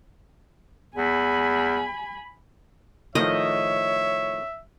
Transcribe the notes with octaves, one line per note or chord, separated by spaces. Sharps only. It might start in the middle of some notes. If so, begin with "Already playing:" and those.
E2 G#5 B5
A2 D#3 F3 C#5 D#5 E5